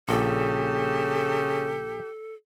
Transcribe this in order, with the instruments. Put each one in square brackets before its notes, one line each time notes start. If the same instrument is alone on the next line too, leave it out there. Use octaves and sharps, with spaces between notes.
[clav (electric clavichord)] A#1 A#2 D5 [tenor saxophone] C#3 [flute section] G4 A5 [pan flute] A4